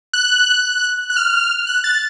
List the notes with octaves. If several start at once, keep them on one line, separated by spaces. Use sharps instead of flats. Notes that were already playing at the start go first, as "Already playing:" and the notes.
F#6
F#6
F6
F#6
A6